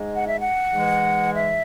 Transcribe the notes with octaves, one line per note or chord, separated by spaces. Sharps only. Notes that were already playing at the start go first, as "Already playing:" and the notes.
Already playing: G#2 G#3
F#5
E5
F#5
G#2 E3 G#3
E5